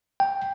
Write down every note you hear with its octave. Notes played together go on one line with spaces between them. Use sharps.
G5